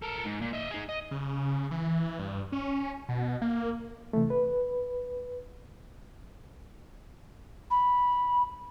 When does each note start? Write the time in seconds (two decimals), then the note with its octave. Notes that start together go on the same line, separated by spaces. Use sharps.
0.02 A4 A#4
0.25 G#2
0.41 A#2
0.53 D#5 E5
0.71 D#4 G#4
0.89 D#5
1.11 C#3
1.71 E3
2.19 G2
2.52 C#4
3.09 B2
3.42 A#3
4.13 C3 E3 A3
4.30 B4
7.70 B5